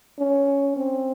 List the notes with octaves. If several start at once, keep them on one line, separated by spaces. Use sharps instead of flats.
C#4
C4